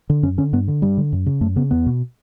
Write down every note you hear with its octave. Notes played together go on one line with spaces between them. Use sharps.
D3
F#2 C#4
D3 C#4
G2 B3
D3
G2 G3
D3
F#2
C#3
F#2 A3
C#3 B3
E2 B3
B2